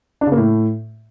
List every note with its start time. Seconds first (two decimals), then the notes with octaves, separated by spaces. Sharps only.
0.21 D4
0.27 C#3
0.32 A#3
0.37 A2